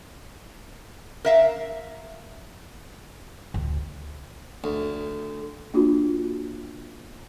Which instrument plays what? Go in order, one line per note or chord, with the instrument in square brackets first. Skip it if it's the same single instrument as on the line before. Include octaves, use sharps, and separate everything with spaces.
[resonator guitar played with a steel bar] A#4 E5 F5
[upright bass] D2
[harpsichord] D2
[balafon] A#3 D4 F4 F#4